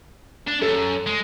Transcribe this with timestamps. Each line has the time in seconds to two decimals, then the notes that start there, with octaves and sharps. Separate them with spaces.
0.47 D4
0.61 F#2 A4
1.06 G#3